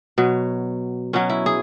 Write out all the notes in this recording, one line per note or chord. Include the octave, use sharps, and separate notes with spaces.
B2 F#3
B2 F#3 C#4
E4
G#4